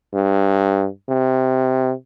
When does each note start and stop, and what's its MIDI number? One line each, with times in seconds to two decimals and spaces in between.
0.14 0.87 43
1.09 1.92 48